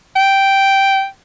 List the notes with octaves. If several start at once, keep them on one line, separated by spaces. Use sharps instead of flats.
G5